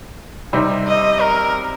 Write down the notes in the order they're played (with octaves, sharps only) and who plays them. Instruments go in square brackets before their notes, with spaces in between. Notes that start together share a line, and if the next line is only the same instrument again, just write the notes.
[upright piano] C3 D#3 G3 C4 D#4
[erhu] D#5
A#4